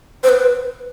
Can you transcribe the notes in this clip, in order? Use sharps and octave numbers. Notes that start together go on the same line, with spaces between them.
C5
B4